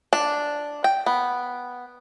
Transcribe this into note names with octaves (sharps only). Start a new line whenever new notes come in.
D4
G5
B3